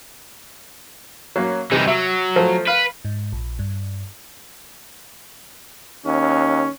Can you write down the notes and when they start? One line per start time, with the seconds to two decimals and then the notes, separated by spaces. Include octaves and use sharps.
1.36 F#3 A#3 C#4
1.72 C3 E3 G3 D#4
1.88 F#3 E5
2.36 F3 A3
2.67 B4 F5
3.05 G#2
3.32 A#1
3.59 G2
6.06 D#2 C#4